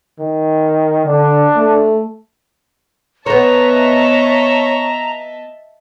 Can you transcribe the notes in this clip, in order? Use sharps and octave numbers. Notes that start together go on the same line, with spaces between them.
D#3
D3 D4
A3
B3 C5 C#5 D#5 E5 A5 A#5